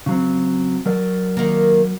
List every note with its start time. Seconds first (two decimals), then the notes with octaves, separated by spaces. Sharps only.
0.06 C#3 F#3 C4
0.86 F#3 A#4 D5
1.37 D#3 A#3